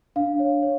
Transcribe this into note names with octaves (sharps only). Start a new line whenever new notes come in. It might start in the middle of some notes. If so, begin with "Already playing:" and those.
D4 F5
C#5
C#5